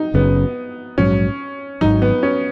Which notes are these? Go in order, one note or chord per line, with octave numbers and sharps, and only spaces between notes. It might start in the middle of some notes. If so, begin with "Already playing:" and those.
Already playing: D#4
F#1 F#2 C#3 B3
A#1 G#2 F#3 C#4
G#1 G#2 D#3 F#3 D#4
B3
C#4